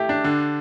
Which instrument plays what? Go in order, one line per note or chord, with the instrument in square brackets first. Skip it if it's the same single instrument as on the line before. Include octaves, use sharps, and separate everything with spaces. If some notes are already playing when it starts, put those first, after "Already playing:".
Already playing: [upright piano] A3 E4 G4
D4
D3